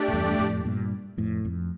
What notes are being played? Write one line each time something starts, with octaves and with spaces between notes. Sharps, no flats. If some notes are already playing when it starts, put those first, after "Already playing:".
Already playing: A3 D4 G4 D5
A2
E2 G2
F2 A2
G2 A#2
F2 A2
F2